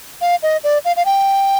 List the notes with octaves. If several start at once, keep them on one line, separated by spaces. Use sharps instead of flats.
F5
D#5
D5
F5
F5
G5